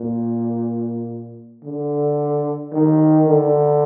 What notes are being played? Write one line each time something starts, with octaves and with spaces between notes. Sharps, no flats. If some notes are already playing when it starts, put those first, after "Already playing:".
Already playing: A#2
D3
D#3
D3